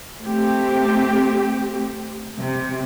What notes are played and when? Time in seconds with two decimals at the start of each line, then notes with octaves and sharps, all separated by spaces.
0.21 A3 C4 G4
2.38 C3